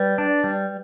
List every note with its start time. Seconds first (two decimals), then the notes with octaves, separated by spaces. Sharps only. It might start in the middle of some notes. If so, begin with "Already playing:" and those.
Already playing: G3 B4
0.18 D4
0.44 G3